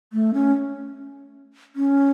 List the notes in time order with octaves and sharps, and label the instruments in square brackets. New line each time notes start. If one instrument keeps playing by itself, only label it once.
[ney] A3
C#4
C#4